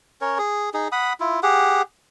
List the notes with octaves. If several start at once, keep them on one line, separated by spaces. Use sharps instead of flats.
C#4 A#4 C#5
G#4
D#4 G#4
F#5 B5 D#6
E4 F4
G4 G#4 F#5